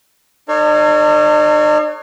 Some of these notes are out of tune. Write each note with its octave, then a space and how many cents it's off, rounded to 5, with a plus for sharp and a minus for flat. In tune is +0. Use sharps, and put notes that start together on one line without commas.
D#4 -45 A4 +45 C#5 +0